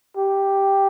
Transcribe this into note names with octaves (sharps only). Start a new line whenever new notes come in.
G4